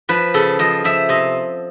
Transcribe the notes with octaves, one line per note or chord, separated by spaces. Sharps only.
F3 B4
C#3 A4
F3 D#5
F3 E5
C3 D#5